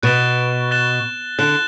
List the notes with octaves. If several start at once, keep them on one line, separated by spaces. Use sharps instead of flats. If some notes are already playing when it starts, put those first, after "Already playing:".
B2 F#6 A6 E7 G7
F#6 A6 E7 G7
D3 F#6 A6 E7 G7